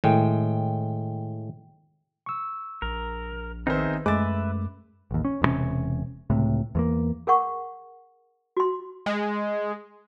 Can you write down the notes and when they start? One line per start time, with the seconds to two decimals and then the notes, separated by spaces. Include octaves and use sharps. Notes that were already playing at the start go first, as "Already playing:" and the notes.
0.04 A2 D#3 G#3 G5
2.26 C#6 E6
2.82 A#1 A#4
3.67 D#3 B3 C4 D#4 G#4 C5 E5
4.06 F#2 G#3 A3 B4 E5 D6 A6
5.11 A1 D#2
5.25 C#4
5.42 E1 G2 C3 C#4
6.30 C#2 A2 C3
6.75 E2 A3 A#3
7.27 G#4 A#4 F#5 C#6
8.57 F#4 C6
9.06 G#3